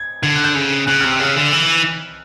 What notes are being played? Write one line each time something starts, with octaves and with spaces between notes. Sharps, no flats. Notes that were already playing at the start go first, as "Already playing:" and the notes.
Already playing: G#6
D3 G#6
F#6
G6
C#3
C#3 F#6
C3 F6
E6
C#3 F6
D3
E3